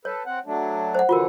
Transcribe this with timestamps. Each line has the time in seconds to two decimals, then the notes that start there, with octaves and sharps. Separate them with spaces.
0.05 A4 B4 C#5
0.26 C4 F#5
0.46 F#3 A3 D4
0.95 C5 F#5
1.09 D3 E3 F3 F4 F#4 A#4